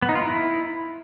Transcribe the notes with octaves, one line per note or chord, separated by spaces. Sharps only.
B3
D#4
F4
E4